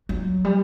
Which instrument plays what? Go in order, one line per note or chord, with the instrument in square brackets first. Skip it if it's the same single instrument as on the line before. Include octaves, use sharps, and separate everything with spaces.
[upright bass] F#3
G3